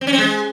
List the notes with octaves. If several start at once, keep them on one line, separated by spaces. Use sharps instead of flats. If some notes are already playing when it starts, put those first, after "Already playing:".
C4
C#4
C4
G#3